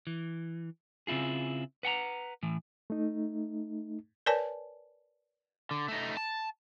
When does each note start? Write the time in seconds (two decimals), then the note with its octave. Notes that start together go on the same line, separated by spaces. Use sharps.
0.07 E3
1.07 C#3 C4 E4 F4 G#4
1.83 B4 F#5 G5 A#5
2.43 A2 E3
2.90 A3 D#4
4.26 A#4 B4 C#5 D5 G#5 A5
5.71 D3
5.88 A3 D#4
6.17 A5